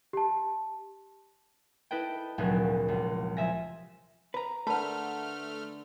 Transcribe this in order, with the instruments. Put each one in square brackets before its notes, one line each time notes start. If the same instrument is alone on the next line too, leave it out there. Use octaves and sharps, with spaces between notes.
[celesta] G4 A5
[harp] E4 A4 B4 D#5 G5
F1 D2 A#2 F#3 G#4
C#2
F3 D#5 E5 G#5 A#6
[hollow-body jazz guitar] B4 A#5
[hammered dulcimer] D3 A#5 [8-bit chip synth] A3 F6 [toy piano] A#4 A5 [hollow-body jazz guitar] B4